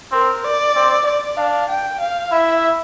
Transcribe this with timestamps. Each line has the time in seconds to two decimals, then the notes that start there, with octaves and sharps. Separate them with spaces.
0.12 C4 A#4
0.44 D5
0.75 C4
1.06 D5
1.37 D4 F5
1.69 G5
2.00 F5
2.31 E4 E5